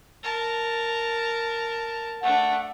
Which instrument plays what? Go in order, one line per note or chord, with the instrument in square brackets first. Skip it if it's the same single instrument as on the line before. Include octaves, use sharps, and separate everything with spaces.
[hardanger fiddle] A#4 A5
[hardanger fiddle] A3 D4 [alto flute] F#5